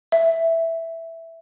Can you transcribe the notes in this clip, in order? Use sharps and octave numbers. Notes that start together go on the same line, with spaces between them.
E5